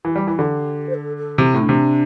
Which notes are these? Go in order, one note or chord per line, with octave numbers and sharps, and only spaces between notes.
E3 G4
G3
E3
D3
C5
A4
A4
C3 E4
A2
D4
C3